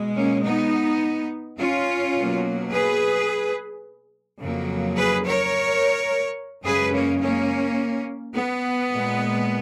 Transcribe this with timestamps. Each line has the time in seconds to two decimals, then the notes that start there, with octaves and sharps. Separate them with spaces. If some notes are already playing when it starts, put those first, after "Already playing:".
Already playing: B2 G#3
0.17 A#3 C#4
0.45 B3 D#4
1.59 C#4 F4
2.15 B2 F#3 A#3
2.71 G#4 B4
4.40 F2 C#3 F#3 A#3
4.96 G#4 B4
5.25 A#4 C#5
6.65 F#2 C#3 G#3 G#4 B4
6.94 A#3 C#4
7.22 A#3 C#4
8.35 B3
8.90 A#2 G#3